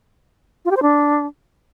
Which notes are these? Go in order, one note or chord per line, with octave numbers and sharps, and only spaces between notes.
F4
G4
C5
D4